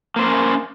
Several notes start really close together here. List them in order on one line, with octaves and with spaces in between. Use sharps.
A#3 C5 C4 A#4 C#4